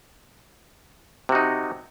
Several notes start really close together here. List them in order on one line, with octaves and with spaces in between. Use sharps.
C3 F#4 D#4